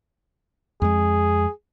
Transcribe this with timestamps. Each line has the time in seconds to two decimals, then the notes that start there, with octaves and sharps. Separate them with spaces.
0.82 F2 G#3 G#4